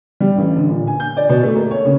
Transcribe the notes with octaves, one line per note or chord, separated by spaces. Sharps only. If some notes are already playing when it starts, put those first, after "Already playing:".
G3
A1
D3
A#2
G#5
G6
D5
B2
A3
A#3
C#5
C#3